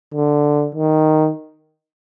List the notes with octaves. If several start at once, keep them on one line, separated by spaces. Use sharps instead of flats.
D3
D#3